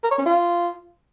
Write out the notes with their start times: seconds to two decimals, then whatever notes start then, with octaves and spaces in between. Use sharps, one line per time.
0.03 A#4
0.11 C#5
0.18 C#4
0.26 F4